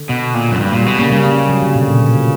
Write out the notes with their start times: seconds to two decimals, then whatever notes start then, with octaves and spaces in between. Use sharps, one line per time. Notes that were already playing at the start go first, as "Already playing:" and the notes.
Already playing: D3
0.09 B2
0.34 A#2
0.52 F#2
0.60 G2 F#3
0.73 A#2 G3
0.86 B2 G3
0.98 C#3 A#3
1.12 C#3 G3
1.25 A#3
1.50 F#3
1.63 D3
1.76 B2
1.88 A#2
2.02 A#2
2.14 B2